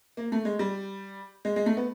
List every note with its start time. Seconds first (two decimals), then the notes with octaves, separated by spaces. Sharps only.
0.17 A#3
0.32 A3
0.45 G#3
0.59 G3
1.45 G#3
1.56 G#3
1.66 A3
1.77 B3